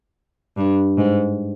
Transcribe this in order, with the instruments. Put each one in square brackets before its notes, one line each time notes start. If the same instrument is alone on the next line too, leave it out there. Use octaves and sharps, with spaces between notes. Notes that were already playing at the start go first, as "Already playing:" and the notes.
[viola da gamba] G2
G#2